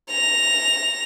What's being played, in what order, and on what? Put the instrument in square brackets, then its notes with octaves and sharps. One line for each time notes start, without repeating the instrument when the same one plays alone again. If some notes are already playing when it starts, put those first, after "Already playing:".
[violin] A#6 F7